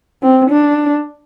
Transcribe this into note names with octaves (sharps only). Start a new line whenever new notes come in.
C4
D4